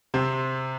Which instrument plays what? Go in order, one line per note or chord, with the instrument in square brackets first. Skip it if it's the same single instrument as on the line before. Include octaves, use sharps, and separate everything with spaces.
[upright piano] C3 C4